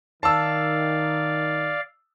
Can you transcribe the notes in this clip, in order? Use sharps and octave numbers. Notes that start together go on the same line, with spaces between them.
D#3 D5 F5 A5 E6